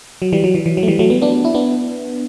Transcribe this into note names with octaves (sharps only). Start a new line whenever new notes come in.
F#3
E3 G3
F#3
E3
E3
F#3
A3
E3 G3
F#3 A3
G3 B3
B3 D4
E4
B3 D4